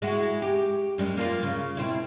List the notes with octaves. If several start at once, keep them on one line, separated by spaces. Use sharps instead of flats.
G#3 E4 F#4
G4
F#2 G3 G#3
A#3 F4 B4
C#3
B2 C4 E4